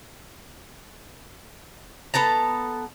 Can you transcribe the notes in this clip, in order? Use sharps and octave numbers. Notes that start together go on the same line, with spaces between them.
B3 A4 A5 A#5